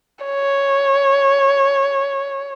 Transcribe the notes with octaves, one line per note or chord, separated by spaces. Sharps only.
C#5